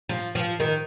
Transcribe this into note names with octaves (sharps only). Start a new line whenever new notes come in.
F3
F3
D#3